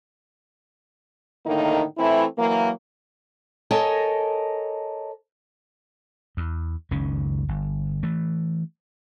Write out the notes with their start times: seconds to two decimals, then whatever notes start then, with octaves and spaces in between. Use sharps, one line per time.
1.46 A2 D3 D#3 A#3 D#4
1.98 E3 A3 C4 E4
2.38 E3 F#3 A#3
3.71 A4 A#4 C#5 D#5 G#5 A5
6.37 E2
6.91 F#1 C#2 D#3 C#4
7.49 G1
8.03 E3 A3